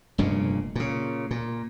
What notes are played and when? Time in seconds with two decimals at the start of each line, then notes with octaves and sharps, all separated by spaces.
0.18 F1 G2 A#2 C#3
0.75 A#2 C#3
1.31 A#2